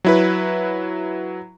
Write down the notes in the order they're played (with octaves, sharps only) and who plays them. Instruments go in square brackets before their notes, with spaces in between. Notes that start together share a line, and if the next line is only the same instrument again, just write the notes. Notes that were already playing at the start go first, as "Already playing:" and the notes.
[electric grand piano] F#3 E4 B4